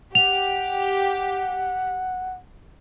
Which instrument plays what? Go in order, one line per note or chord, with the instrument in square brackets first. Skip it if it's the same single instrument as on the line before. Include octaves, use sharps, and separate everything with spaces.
[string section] G4 [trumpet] F#5 [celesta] F7